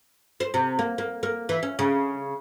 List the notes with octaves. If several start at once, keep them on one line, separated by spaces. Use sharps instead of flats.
C5
C3
A#3
A#3
A#3
E3
C#4
C#3